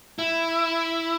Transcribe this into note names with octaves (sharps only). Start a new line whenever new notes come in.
E4